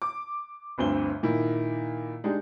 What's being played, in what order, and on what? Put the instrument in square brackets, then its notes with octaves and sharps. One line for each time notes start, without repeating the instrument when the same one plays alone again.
[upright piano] D6
G1 D2 G2 C4 G7
A#2 D#3 E4
G#3 D4 D#4 G4